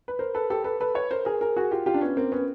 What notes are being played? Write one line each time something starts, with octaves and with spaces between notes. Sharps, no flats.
B4
A#4 C5
A4 B4
G4 A4
A4 B4
A4 B4
B4 C#5
A#4 C5
G#4 A#4
G#4 A#4
F#4 G#4
F4 G4
F4 G4
D4
B3 C#4
A#3 C4
B3 C#4